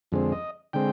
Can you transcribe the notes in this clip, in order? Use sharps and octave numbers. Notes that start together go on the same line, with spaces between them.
F2 D3 G#3 C4
D#5
D3 G#3 C4 G5